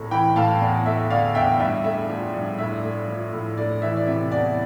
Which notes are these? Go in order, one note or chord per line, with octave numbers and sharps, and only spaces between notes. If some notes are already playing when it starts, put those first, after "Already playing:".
Already playing: C2 A2 A3
E3 G5 B5
A2 F5 A5
E2
A3 E5
D3 D5 F5
E2 E5 G5
G2 E5
A3 E5
F3
G2
A2 E5
A3
F3
A2
A3 D5
E3 E5
D5
C3 E5
E2 D5